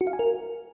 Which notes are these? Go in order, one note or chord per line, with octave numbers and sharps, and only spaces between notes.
F#4
F5
G#5
A#4